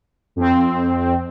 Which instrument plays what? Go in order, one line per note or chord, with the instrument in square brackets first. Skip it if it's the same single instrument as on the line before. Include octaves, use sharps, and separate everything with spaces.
[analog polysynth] F2 C4